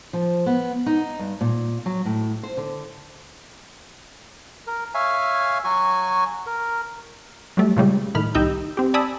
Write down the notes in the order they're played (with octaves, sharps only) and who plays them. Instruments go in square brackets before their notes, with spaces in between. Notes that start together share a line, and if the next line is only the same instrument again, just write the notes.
[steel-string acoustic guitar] F3
B3
D#4
G2
A#2
F#3
A2
C5
D3
[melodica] A#4
C#5 E5 F5 G#5
F#3 F#4 G#5 C#6
A#4
[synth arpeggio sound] F#3 G3 A3
A#2 C#3 G3 G#3
A2 D#3 B5 F6
C2 D#4 G4 E6 G6
C4 G4
D5 G#5 A5 B5 D#6 E6